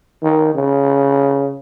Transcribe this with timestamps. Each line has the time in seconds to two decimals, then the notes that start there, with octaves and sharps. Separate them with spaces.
0.23 D#3
0.55 C#3